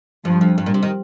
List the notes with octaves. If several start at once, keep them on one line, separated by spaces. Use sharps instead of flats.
G2 F3
F2
G2
A#2
C3
D#3